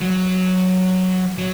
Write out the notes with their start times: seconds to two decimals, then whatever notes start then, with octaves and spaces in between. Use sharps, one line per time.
0.02 F#3
1.38 F#3